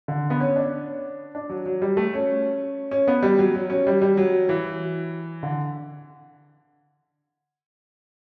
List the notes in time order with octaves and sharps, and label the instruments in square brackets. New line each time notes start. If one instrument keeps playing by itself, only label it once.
[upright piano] D3
B3
C#4
D4
D4
F#3
F#3
G3
A3
C#4
C#4
B3
G3
F#3
F#3
C#4
G3
G3
F#3
E3
D3